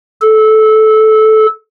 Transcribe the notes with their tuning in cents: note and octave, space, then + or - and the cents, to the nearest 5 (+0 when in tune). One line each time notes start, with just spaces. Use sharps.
A4 -15